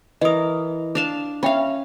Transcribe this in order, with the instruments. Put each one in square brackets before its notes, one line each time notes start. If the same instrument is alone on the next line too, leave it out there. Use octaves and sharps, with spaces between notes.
[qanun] E3 A#4 [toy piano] D#5 D#6
[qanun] D4 F5 A5
[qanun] C#4 F5 [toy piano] E5 G5 B5